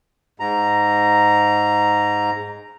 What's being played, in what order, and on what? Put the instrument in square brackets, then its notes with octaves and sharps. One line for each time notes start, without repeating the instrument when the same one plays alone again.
[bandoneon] G#2 A#5